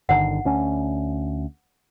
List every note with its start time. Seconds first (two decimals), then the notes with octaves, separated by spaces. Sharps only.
0.09 G1 D3 D#3 F#5
0.45 D2 C#4